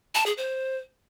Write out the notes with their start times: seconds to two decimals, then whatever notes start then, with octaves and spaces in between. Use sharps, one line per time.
0.15 A5
0.26 G#4
0.37 C5